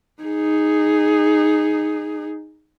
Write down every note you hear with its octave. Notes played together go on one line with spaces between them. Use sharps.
D#4 G#4